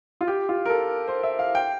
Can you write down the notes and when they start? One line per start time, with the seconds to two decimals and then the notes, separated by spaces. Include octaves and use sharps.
0.21 F4
0.28 G4
0.49 F4
0.65 A#4
0.70 A4
1.08 C5
1.23 E5
1.39 F5
1.55 G5